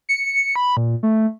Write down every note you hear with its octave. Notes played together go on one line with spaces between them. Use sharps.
C#7
B5
A#2
A3